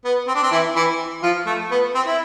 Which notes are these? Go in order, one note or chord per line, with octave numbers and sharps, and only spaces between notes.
B3
C4
D4
C4
E3 E4
E3 E4
F3 F4
A3
B3
C4
E4